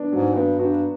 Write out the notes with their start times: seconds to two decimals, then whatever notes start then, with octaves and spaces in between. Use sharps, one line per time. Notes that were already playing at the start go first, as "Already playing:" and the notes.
Already playing: B3 D4
0.12 G#2 F#3
0.35 G2 B3
0.59 G2 F#4